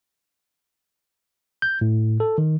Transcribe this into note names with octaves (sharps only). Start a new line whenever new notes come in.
G6
A2
A4
D#3